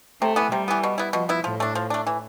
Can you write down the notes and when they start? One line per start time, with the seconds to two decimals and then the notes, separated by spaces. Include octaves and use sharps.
0.21 C3 A3
0.36 E3 B3
0.52 C3 G3
0.68 E3 B3
0.83 B2
0.98 B3 E4
1.13 B2 F3
1.29 B3 E4
1.44 A2 F3
1.60 A3 D4
1.75 F3
1.90 A3 D4
2.07 E3